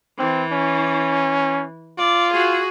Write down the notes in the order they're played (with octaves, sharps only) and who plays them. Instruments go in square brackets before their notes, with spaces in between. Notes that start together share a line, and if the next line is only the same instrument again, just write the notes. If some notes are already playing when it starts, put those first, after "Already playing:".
[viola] E3 [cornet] C4
[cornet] C#4
[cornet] F4 [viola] D5
[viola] F#4 G#4